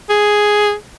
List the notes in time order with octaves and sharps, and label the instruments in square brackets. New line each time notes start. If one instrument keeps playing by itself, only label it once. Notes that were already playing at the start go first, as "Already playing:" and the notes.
[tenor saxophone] G#4